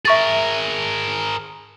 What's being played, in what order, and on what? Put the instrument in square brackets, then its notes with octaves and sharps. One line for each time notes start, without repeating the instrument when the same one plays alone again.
[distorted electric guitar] G#4 A#4 [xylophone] E5 C#6 A6